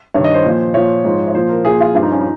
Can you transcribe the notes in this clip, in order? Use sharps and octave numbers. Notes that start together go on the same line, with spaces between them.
G2 D#3 C#5
D#5
C5
A#2 F3
A#2 F3 C#5
G#2 F3
C#5
A#2 F3 C5
A#4
A#2 F3 G#4
F4
G2 F3 F4
D#4
C#4
D#4